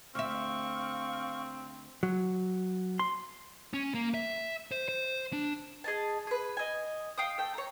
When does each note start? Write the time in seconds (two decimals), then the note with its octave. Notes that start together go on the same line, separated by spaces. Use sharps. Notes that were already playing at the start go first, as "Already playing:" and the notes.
0.15 D2 C4 E5 F5 C#6
2.03 F#3
2.99 C6
3.74 C#4
3.94 A#3
4.14 E5
4.72 C5
4.89 C5
5.33 D4
5.84 G#4 D#5 A5
6.27 G#4 B4
6.57 D#5 G#5
7.18 F5 G5 D#6
7.38 A3 G5
7.54 C#5 A#5